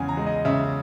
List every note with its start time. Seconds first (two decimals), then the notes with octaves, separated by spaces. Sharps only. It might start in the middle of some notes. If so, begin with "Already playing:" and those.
Already playing: E2 C#3 G#3 G#5
0.08 A#5
0.17 G#3
0.26 D#5
0.45 C#3 E5